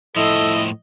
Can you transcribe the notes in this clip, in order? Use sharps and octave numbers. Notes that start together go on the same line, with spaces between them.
A2 F3 E4 A4 D#5